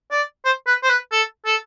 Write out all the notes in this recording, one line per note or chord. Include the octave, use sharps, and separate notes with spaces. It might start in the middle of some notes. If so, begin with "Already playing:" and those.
D5
C5
B4
C5
B4
A4
A4